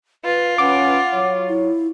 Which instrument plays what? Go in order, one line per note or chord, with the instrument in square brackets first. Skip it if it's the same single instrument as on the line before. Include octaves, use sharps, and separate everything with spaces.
[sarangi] F4 [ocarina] B4
[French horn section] C#4 B4 [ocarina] F#5 [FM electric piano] D6
[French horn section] F#3 C#5
[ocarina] E4